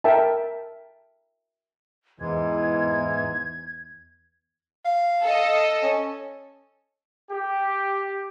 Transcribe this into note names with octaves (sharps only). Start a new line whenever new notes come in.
A#4 E5 G5 A5
E2 G#2 E3 G#3 G#6
F5
A4 D#5
C#4
G4